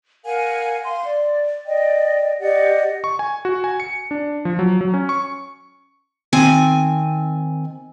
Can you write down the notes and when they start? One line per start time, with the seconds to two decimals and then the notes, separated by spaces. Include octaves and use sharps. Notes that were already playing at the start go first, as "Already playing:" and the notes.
0.25 A#4 F5 F#5 G#5
0.84 F5 C6
1.03 D5
1.65 D5 D#5 G5
2.39 G4 D5 D#5 F#5
3.04 C#6
3.19 G#5
3.45 F#4
3.64 G#5
3.80 C#7
4.11 D4
4.45 F3
4.59 F#3
4.81 F#3
4.94 C#4
5.09 C#6
6.33 D#3 C4 G#5